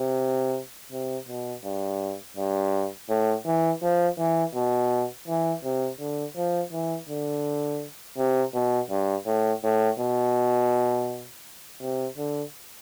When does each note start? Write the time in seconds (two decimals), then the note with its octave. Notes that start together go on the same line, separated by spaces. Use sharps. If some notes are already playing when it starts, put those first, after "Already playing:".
Already playing: C3
0.92 C3
1.28 B2
1.64 G2
2.37 G2
3.09 A2
3.46 E3
3.82 F3
4.19 E3
4.55 B2
5.28 E3
5.64 C3
6.00 D3
6.36 F3
6.72 E3
7.09 D3
8.18 C3
8.54 B2
8.90 G2
9.27 A2
9.64 A2
10.00 B2
11.81 C3
12.17 D3